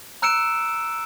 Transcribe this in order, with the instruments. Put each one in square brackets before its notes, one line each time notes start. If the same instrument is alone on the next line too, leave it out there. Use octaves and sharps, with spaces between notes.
[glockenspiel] A#5 E6 F#6 C#7 D7 E7